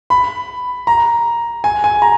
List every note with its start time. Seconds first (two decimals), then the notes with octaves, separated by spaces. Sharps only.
0.10 B5
0.87 A#5
1.64 G#5
1.84 G#5
2.02 A#5